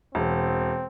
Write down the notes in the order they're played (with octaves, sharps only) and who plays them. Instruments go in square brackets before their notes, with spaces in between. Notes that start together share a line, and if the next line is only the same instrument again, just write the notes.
[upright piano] E1 [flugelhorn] C4